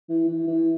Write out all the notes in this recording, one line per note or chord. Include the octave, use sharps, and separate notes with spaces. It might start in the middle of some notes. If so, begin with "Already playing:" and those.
E3
E3
E3